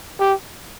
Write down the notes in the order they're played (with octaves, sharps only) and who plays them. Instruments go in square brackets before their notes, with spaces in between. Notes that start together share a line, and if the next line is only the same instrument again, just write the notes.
[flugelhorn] G4